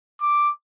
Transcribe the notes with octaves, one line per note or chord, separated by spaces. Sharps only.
D6